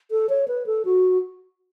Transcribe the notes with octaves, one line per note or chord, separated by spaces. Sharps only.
A4
C#5
B4
A4
F#4